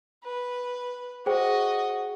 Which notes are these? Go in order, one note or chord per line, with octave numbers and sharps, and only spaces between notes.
B4
F#4 G#4 C5 D#5 G5